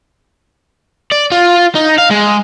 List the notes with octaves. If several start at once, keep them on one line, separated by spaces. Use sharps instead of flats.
D5
F4
D#4
F5
G#3